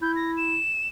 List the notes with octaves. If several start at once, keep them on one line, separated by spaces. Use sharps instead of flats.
E4 G6
A#6
E7